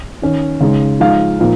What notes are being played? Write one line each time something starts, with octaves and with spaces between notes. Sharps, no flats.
D#3 C#4
C#3 G#3 D#4
F3 G#3 D#4 F5
A#2 F3 A#3 D#4